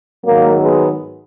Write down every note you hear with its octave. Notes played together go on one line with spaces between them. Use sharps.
G#2 D#3 F#3 A#3
G#3 B3